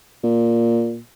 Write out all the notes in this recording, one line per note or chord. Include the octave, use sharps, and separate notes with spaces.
A#2